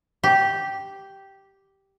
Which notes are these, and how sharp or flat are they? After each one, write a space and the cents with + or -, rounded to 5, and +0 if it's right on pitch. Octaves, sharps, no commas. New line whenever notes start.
G4 -5